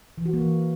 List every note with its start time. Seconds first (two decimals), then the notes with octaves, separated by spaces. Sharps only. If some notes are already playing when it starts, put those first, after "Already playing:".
0.18 E3
0.26 F#4
0.33 A#3
0.41 E3